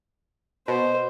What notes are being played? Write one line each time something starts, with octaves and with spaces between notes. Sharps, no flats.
B2 C5